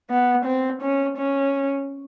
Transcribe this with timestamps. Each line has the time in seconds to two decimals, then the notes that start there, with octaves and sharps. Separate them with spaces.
0.10 B3
0.45 C4
0.82 C#4
1.17 C#4